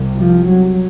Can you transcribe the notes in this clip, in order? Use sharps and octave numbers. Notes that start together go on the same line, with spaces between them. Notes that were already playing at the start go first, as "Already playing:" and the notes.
Already playing: C2 C3
F3
F#3